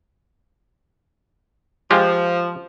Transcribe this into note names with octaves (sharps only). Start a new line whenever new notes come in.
F3 G#3 F4 G4